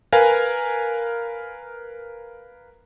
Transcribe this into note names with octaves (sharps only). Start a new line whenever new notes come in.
A#4 B4 F5 G#5